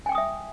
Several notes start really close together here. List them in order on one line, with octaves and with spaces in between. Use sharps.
G#5 G5 D6 D#6 E5